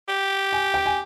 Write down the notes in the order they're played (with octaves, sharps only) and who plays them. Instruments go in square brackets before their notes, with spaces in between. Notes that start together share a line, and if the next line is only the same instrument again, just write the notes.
[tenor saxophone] G4
[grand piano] G#5
G5
G#5